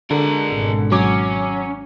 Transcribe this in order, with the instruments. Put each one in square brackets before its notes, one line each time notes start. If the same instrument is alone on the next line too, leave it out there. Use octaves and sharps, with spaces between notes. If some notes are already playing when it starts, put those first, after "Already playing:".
[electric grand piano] D3 [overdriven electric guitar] G#3 A#4
[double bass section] G#1 B2
[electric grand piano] F#3 D6 [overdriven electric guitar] C#4